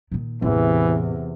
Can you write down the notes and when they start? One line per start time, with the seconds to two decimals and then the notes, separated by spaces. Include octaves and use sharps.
0.12 A#2 D#3
0.42 A1 E2 C3 E3